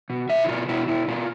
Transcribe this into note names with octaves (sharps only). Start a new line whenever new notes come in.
B2
B2 E5
E4
B2 F4
B2 E4
B2 E4
B2 F4